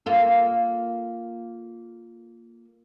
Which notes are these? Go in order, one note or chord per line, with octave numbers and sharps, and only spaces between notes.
A#3 F4 A4